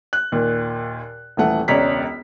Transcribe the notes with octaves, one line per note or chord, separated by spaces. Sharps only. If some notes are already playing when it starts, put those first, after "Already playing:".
F#6
D#2 A#2
D#1 E3 A3 F#5
E1 C#2 C#5 D5 A#5 B6